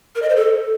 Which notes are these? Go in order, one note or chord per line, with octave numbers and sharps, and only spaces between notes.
A#4
D#5
C5
A4